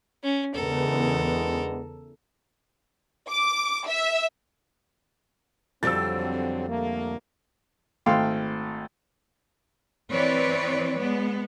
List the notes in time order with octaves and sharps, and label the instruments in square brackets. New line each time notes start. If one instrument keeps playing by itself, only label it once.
[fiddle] C#4
[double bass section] E2 C#3 E3 [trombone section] G#3 B3 D4 [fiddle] A4 A#4
[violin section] D6
E5
[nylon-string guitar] F2 G3 [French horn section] D3 F#3 C4 [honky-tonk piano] E6 A6
[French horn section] D3 A3 A#3
[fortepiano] G#1 A3 F5 G5 C6
[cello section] E3 C4 B4 C#5 D5
G#3 B3